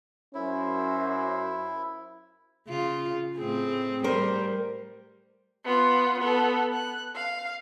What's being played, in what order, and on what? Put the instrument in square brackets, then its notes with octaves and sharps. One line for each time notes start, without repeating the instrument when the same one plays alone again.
[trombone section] F#2 [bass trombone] C#4 [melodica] E4 [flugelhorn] C5
[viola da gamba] C#3 F4
A2 C4 G#4
[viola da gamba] G3 [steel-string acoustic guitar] A#4 C5
[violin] B3 F4
B3 A4
F#6
F5